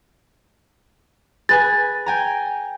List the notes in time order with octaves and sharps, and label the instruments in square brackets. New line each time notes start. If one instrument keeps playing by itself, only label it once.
[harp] G#4 B4 G#5 [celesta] A6
[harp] G5 G#5 A#5